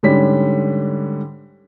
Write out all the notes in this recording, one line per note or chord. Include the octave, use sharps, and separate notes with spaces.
G#2 D3 G3 C#4 B6